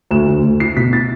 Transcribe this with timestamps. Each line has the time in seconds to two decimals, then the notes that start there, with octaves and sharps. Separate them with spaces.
0.11 D2 E7
0.28 D2
0.44 D2
0.60 E4 C7
0.77 B2 B6
0.93 E4 A6